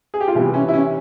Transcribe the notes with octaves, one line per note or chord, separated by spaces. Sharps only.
G#4
G4
F4
C3 E3 G3 E4
C#4
E4
C#4